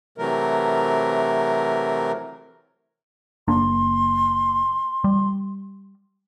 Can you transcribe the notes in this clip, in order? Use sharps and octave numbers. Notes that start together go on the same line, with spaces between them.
C3 E3 F#3 A3 A#4
F#1 A#3 D4 C6
G3